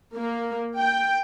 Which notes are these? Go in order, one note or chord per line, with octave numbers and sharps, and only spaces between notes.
A#3
G5